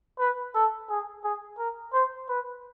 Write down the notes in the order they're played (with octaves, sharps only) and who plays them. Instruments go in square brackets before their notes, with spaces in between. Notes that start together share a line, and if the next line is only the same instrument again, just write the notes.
[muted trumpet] B4
A4
G#4
G#4
A#4
C5
B4